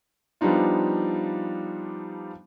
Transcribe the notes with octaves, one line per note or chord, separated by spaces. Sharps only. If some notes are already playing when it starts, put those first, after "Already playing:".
F3 G3 B3 D4 D#4 F4